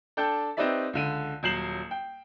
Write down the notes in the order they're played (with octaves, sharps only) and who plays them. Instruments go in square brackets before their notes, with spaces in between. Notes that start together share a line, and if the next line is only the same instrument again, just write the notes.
[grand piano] D4 A4 G5 G6
C4 D#4 G4 B4 D5 E5
C#2 D3 D#7
D#1 F#3 G6 C7 E7 F#7
G5